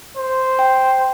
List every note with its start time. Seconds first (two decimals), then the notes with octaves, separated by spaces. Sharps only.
0.17 C5
0.59 G5